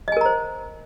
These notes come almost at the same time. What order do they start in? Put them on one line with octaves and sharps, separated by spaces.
D#5 G#5 A#4 A#5 C5